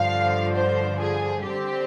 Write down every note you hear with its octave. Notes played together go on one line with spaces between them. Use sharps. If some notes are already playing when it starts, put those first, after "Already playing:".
Already playing: G2 D3 F3 F5
C5
G#4
D3 G3 C4 G4